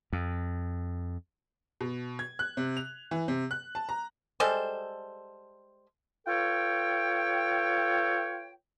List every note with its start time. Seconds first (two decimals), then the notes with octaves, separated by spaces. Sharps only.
0.13 F2
1.81 B2
2.19 G#6
2.39 F#6
2.57 C3
2.77 F7
3.11 E3
3.28 C3
3.51 F#6
3.75 A5
3.89 A#5
4.40 G3 G#3 A4 C5
6.27 F4 A4 B4 C#5 G5